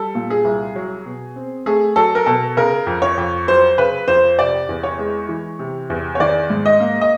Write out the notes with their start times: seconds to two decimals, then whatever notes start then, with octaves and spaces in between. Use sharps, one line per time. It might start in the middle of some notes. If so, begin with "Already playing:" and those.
Already playing: G3 A4
0.15 A#2
0.30 G#4
0.45 C2
0.76 F#3
1.06 B2
1.36 C4
1.66 A3 G#4
1.96 F#3 A4
2.15 A#4
2.26 B2 A4
2.57 C#3 A#4
2.87 F2
3.02 C#5
3.18 F2
3.48 F#3 C5
3.78 C#3 B4
4.08 F2 C5
4.39 C3 D5
4.69 E2
4.83 C#5
4.99 G#3
5.29 E3
5.59 C3
5.90 E2
6.15 C#5
6.20 D#3 D5
6.50 G#2
6.66 D#5
6.80 A#3
7.01 D#5